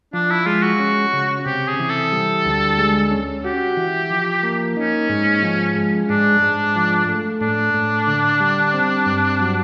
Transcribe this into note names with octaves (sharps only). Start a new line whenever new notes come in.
F3 D4
E4
G#3 F4
F#4
C#4
C#3
C3 G4
G#4
E3
A4
G3
D2
G#3
C#4
F#4 G4
E3
F3
A#3
C#4 D#4
G#2
F3
G#3
G#2 D4
G#2
F3
A3
A2 D4
A2
D3
G3
C4
G2
F#3